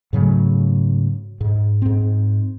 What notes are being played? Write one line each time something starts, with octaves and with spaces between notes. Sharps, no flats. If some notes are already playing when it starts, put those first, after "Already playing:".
G#2 C#3 F#3 A3
G#2
G#2 C4